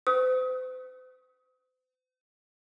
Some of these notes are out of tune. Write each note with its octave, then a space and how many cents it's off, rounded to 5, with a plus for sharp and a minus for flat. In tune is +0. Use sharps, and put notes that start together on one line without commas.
C5 -40 D#6 +30